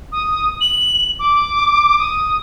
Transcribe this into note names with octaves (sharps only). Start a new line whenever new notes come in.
D#6
F#7
D6
D#6